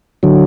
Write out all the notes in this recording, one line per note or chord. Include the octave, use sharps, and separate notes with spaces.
D3 F#3